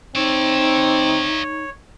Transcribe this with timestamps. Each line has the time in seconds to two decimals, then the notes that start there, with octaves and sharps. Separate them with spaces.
0.15 C4 D#4 C#5 D5 E5